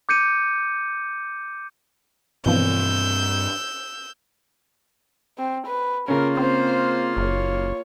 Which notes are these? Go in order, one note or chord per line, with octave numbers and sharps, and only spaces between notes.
D6 G6 C#7 D#7
G2 B2 E3 F3 C4 E6 G6
C4
B4
C#3 A#3 C#4 F4 A#4
C4 C5
F#1 C#5